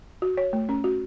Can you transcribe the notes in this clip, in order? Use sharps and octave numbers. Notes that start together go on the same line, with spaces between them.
F#4
C#5
A3
C#4
F#4